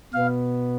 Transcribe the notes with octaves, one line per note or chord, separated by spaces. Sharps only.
B2 B3 F5